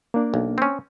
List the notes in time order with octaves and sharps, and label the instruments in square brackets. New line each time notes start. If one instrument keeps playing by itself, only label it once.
[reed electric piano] A#3 D4
[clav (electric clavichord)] B1
C4 C#4